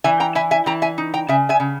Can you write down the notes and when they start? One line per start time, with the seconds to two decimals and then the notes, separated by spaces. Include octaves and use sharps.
0.04 E3 E5 G#5
0.20 G5 A#5
0.35 E4 E5 G#5
0.51 E5 G#5
0.66 E3 G5 A#5
0.82 E5 G#5
0.98 D#4
1.14 G5 A#5
1.28 C#3 E5 G#5
1.49 E5 G#5
1.60 C#3